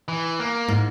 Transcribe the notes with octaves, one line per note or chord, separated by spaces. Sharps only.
E3
A#3
G#2